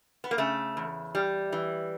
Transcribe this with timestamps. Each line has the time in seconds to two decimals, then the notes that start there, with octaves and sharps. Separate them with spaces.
0.24 B3
0.31 A#3
0.38 C#3 A3
0.77 E2
1.15 G3
1.52 E3